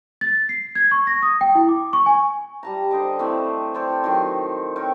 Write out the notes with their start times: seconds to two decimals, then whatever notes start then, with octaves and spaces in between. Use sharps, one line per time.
0.21 A6
0.49 C7
0.75 G#6
0.91 C#6
1.07 A#6
1.22 D#6
1.41 G5
1.55 E4
1.69 D6
1.93 C#6
2.06 G#5
2.63 G3 A5 A#5
2.91 D3 C5 D#5 D6
3.19 E3 A3 C4
3.74 A4 C5 D5 G5
4.04 D#3 F#3 C6
4.76 C4 A#4 C#5 G5